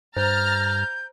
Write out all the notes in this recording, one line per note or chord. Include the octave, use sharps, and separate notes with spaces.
G2 C5 A#5 F6 G6 A6